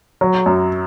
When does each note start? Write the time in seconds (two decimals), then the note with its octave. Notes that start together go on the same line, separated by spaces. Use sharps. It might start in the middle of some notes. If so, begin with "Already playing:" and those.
0.21 F#3
0.46 F#2